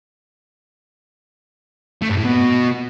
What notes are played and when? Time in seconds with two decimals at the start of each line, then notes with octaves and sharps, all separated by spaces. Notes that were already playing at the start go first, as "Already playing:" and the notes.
2.02 A3
2.09 G2
2.17 A2
2.25 B2